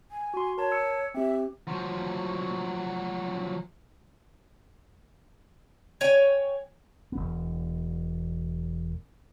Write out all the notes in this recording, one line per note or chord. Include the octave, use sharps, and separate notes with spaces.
G#5
F#4 C6
A#4 C#5 A5
E6 C#7
C4 G4 E5
F3 F#3
C#5 G5 G#5
E1 B3